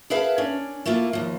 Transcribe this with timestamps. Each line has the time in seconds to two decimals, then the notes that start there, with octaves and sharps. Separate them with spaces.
0.10 G#4 A#4 B4 E5 F5 A5
0.38 C#4 D4
0.86 A3 A#3 E4 F4
1.13 D#2 F3